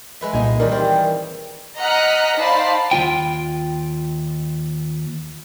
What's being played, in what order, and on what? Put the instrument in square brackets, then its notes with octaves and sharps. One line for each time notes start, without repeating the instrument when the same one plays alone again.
[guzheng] G#3 B4 E5
[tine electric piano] C2 A#2 A#3 [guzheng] D#4 D#5 G#5
[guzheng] D#3 E3 G3 [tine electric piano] A#4 D5
[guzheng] C4 G4
[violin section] D#5 F#5 A#5 F6 F#6 B6
D#4 C5 D5 F5 A5 B5
[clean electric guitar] D#2 F3 F4 G5